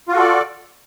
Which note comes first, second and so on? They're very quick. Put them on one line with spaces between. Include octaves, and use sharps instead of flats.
F4 F#4 A4 D5